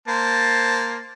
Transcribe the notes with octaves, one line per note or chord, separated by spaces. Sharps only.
A#3 C5 A5